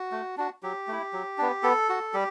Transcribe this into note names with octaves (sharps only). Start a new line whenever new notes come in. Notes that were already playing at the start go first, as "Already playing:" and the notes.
Already playing: F#4
A3
D4 F#4
F#3 G4
A3 E4
F#3
B3 D4
B3 A4
F#4
G3 G4